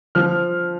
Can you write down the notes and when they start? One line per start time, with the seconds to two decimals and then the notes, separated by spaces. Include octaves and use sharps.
0.15 F3 F6